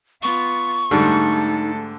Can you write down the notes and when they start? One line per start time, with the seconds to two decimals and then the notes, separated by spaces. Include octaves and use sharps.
0.23 B3 F4 C#6
0.91 G#2 D3 G3 A3 D#4 A4